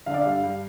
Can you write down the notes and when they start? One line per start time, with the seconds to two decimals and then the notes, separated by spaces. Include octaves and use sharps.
0.06 D3 F5
0.14 D5
0.22 G2 F5
0.43 G2